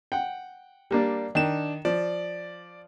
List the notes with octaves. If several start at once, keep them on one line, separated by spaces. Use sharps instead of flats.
F#5 G5
G3 A#3 D4
D#3 D4 E7
F3 D5